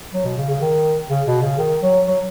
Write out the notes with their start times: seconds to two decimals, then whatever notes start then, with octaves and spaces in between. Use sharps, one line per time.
0.13 F#3
0.25 B2
0.37 C#3
0.50 C#3
0.62 D#3
1.10 C#3
1.27 B2
1.42 C#3
1.59 D#3
1.82 F#3
2.07 F#3